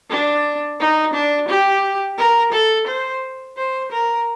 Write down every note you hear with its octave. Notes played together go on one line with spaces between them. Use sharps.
D4
D#4
D4
G4
A#4
A4
C5
C5
A#4